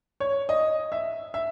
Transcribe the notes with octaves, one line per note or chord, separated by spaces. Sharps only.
C#5
D#5
E5
E5